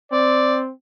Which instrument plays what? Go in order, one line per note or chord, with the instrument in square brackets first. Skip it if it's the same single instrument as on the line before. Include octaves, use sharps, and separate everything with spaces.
[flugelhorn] C4 [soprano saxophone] D5